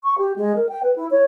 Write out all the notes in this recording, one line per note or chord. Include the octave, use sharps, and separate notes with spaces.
C#6
G4
G#3
A#4
G5
B4
E4
C#5